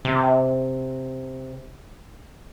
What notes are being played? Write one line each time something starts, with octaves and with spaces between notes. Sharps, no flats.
C3